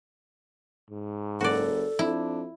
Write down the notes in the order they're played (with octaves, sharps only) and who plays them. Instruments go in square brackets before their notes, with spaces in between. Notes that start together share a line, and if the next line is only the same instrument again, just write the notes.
[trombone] G#2
[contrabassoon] F#1 [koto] F#4 D5 [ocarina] A4
[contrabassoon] F2 [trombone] D4 [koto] E4